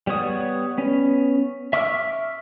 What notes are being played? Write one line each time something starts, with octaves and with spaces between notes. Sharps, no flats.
G3 B3 C#5 D#6
B3 C#4
E5 C#6 D6 E6 F6